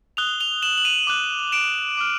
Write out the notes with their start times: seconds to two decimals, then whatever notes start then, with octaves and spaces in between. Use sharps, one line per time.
0.17 D#6 F#6 F7 G7
0.40 F7 G7
0.63 E7 F#7
0.78 F#7
0.85 D#7 F7
1.07 D6 F#6
1.52 D7 E7
1.97 D6 F6